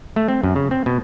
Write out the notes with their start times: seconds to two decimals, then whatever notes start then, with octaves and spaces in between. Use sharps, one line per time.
0.16 A3
0.28 C4
0.43 F#2
0.56 C#3
0.71 C4
0.86 B2